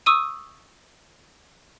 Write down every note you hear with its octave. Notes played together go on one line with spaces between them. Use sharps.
C#6 D#6 E6 D#7